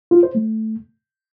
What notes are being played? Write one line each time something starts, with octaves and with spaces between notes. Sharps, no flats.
F4
C5
A3